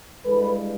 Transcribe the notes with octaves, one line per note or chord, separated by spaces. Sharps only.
G2 E3 G#3 A4 B4